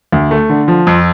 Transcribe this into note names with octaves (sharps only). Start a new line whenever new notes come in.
D2
A3
D3
F3
F2